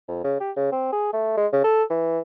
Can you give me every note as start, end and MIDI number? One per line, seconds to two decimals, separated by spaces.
0.09 0.22 41
0.25 0.37 49
0.41 0.52 67
0.56 0.69 49
0.72 0.88 60
0.93 1.11 68
1.13 1.34 57
1.37 1.47 56
1.53 1.60 49
1.64 1.84 69
1.90 2.20 52